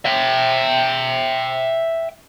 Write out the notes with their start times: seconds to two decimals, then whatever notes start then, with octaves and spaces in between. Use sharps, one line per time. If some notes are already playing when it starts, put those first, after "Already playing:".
0.05 E5 G5